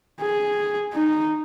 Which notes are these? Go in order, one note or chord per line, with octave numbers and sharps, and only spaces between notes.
G#4
D#4